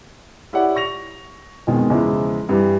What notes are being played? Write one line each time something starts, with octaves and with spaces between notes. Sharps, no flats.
E4 G4 C#5 D5 F#5
C#6 A#6 F7
B1 F2 B2 D#3 G#3
E2 C#3 F3 G#3 E4
G2 E3 G3